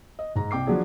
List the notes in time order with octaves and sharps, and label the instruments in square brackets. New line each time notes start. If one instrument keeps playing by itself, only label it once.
[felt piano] D#5
G#2 A#5
C2 G5 D6 C7
F3 F#3 D4 G#4